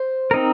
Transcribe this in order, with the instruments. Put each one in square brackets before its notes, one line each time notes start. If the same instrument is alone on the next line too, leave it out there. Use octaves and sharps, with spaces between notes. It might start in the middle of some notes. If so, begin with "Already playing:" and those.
Already playing: [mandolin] C5
[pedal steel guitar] C4 D#4 A#4